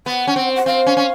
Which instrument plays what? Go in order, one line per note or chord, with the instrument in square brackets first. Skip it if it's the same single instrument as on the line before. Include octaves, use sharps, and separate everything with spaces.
[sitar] B3 [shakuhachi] F#5
[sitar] C#4
C4
[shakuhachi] F#5
[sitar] C4 [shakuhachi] F5
[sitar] C#4
C#4